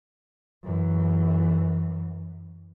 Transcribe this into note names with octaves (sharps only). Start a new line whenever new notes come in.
F#2 E3